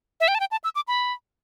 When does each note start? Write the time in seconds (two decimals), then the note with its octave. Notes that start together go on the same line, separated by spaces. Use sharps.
0.20 E5
0.28 G5
0.35 A5
0.40 G5
0.51 A5
0.64 E6
0.75 D6
0.88 B5